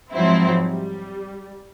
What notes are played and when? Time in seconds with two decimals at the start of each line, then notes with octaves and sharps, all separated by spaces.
0.13 G#2 F3 F#3 C4 E4
0.61 G3